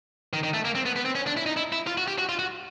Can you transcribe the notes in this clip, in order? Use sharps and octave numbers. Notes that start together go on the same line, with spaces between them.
D#3
D#3
A3
A#3
C4
B3
B3
C4
C#4
D4
E4
D#4
E4
E4
F4
F#4
G4
F#4
F4
F#4